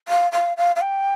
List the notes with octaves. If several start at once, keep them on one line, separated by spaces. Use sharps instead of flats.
F5
F5
F5
F5
G5